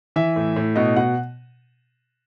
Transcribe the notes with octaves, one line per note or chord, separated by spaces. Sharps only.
E3 E5
A2
A2
B2 D#5
B2 F#5